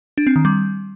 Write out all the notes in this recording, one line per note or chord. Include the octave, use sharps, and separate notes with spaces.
D4
C4
D#3
G3